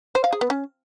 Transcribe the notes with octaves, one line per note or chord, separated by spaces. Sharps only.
C5
F5
G#4
B3
C#4